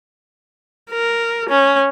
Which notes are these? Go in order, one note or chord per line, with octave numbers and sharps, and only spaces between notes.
A#4
C#4